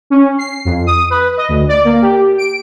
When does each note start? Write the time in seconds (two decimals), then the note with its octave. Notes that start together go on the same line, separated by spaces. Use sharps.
0.10 C#4
0.38 C7
0.65 F2
0.86 D#6
1.10 B4
1.37 D#5
1.49 D2
1.68 D5
1.84 A#3
2.02 G4
2.38 D7